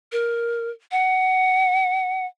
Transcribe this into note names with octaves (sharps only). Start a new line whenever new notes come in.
A#4
F#5